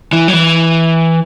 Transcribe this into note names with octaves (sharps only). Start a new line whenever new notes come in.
E3
F#3
E3